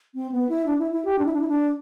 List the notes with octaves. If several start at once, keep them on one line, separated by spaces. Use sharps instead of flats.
C4
B3
E4
D4
E4
E4
G4
D4
E4
D4
E4
D4